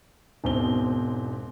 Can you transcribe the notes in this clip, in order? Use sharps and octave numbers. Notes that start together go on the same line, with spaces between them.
E1 G#2 B2 C4 G7